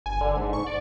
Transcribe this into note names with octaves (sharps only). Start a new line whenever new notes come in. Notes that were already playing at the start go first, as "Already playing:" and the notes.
G1 G#5
D3
G#2
C#6
D5